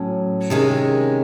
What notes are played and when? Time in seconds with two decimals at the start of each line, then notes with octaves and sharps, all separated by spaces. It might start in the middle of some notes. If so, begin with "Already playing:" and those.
Already playing: A2 F#3 C#4
0.50 C3 D#3 G#3 C#4